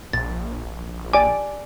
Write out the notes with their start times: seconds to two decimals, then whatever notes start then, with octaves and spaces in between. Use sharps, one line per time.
0.13 A#1 A6
1.13 D5 G#5 D6